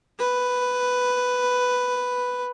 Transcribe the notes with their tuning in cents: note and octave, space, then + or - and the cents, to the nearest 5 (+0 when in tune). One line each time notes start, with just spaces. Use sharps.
B4 +5